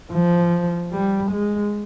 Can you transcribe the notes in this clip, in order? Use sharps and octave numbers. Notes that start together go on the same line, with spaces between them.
F3
G3
G#3